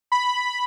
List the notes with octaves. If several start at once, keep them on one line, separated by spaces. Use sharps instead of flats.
B5